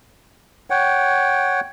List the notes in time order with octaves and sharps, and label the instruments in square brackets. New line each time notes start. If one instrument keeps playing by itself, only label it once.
[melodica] C#5 F#5 G5